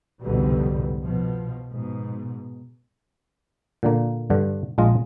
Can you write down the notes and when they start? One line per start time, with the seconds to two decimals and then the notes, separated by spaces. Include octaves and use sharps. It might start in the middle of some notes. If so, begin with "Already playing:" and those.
0.22 C2 F2 G#2 B2 D3 G3
1.03 B2 F3
1.71 G#2 B2
3.83 A#2 D3 A#3
4.30 G2 D3
4.78 A#1 G#3 F4 D#5